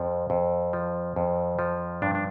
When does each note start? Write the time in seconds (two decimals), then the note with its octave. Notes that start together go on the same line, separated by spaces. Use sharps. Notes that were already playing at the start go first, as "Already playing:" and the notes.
Already playing: F2 F3
0.30 F2
0.73 F3
1.16 F2
1.59 F3
2.02 G2 D4
2.15 D4